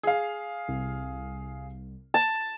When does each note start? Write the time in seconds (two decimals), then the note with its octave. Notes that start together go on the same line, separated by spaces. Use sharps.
0.03 G#4 F5
0.68 C2
2.14 A5